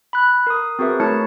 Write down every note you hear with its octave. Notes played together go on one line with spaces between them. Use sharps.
B5 F#6
A#4 D#6
C4 F#4 G#4 A#4 B4 E5
A3 E4 A#4 C#5 A5 C#7